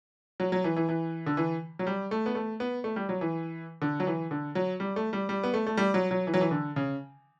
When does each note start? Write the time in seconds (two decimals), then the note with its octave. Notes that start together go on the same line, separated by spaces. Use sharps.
0.40 F#3
0.52 F#3
0.64 E3
0.76 E3
0.89 E3
1.26 D3
1.37 E3
1.79 F#3
1.87 G3
2.11 A3
2.26 B3
2.35 A3
2.60 B3
2.84 A3
2.96 G3
3.09 F#3
3.21 E3
3.82 D3
4.00 F#3
4.07 E3
4.31 D3
4.55 F#3
4.80 G3
4.96 A3
5.13 G3
5.29 G3
5.44 B3
5.54 A3
5.67 A3
5.77 G3
5.94 F#3
6.11 F#3
6.27 E3
6.34 F#3
6.41 E3
6.51 D3
6.76 C#3